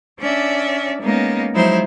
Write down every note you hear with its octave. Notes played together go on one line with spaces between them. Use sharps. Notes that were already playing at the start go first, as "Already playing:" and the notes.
C#4 D4 D5 E5
G#3 A#3 B3 C#4 D#4
F3 F#3 G#3 D#4 E4 C5